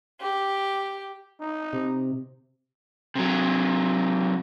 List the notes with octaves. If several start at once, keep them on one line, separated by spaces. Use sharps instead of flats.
G4
D#4
C3
C3 F#3